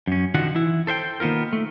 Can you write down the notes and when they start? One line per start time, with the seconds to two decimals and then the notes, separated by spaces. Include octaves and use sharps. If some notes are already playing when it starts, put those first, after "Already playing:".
0.07 F#2 C#4
0.34 D3 D#3 F3 F4 F#4 F#5
0.55 E3 E4
0.87 A4 C5 E5 G5
1.20 D#3 A#3 B3 F4 A#4
1.53 A3